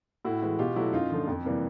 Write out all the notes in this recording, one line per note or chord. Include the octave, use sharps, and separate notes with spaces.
A2 E4 F#4
E3 G#3
B2 F4 G4
F#3 A3 E4 F#4
F#2 D#4 F4
D3 F3 A3
F2
C3 E3 G3 A#3